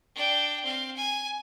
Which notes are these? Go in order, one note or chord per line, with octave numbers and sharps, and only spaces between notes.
D4 G5
C4 F5
G#5